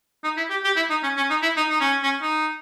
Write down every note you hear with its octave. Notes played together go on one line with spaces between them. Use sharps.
D#4
E4
G4
G4
E4
D#4
C#4
C#4
D#4
E4
D#4
D#4
C#4
C#4
D#4